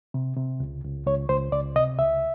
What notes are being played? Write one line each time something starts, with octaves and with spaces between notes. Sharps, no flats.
C3
C3
C#2
C#2
C#2 C#5
C#2 C5
C#2 D5
C3 D#5
C#2 E5